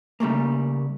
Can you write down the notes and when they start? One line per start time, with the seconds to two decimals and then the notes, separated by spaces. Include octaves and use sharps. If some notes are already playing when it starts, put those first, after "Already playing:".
0.20 C#3 G3 A3 A#3